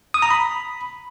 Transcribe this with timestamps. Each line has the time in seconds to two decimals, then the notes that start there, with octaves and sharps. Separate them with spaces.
0.14 D#6
0.22 A#5
0.30 B5